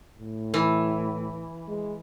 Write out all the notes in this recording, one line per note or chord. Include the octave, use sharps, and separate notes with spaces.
A2
E3
G#3